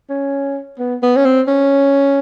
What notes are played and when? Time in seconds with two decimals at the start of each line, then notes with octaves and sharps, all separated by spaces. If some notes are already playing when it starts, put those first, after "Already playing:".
0.10 C#4
0.79 B3
1.02 B3
1.16 C#4
1.25 C4
1.48 C#4